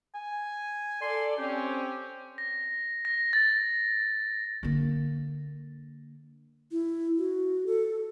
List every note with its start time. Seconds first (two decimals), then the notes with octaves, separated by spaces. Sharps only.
0.15 G#5
1.02 A4 D5 C6
1.38 C4 C#4 G4
2.38 A#6
3.05 A#6
3.33 A6
4.63 D3 A#3
6.72 E4
7.18 F#4
7.67 A4